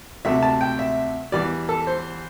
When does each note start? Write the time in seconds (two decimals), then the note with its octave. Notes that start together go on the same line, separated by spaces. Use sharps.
0.25 D2 C3 A3 E5
0.43 A5
0.61 G5
0.79 E5
1.32 E2 E3 G3 D5
1.69 A4
1.87 C5